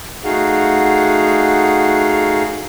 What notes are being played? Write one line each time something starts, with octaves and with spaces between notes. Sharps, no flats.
A3 D#4 F#4 G#4 F5 F#5